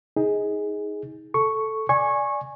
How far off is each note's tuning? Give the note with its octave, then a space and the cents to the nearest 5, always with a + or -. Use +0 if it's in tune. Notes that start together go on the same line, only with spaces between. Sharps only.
D#4 +20 G#4 +0
A4 +0 C#6 +0
D5 +0 G#5 +0 C#6 -20